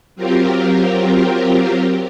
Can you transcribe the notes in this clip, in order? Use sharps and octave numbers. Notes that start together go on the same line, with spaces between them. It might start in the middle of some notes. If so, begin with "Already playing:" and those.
F#3 C4 F4 G4 A#4